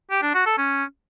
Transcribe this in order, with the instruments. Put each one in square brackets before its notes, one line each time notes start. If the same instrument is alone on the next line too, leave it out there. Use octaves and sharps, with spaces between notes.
[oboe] G4
D4
F#4
A4
C#4